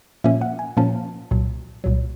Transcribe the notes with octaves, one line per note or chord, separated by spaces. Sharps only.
A#2 F3 A#3 C#4 E5
F#5
G#5
A#2 F3 A#3 C#4 A5
C2 A#2 F#3
C2 A#2 F#3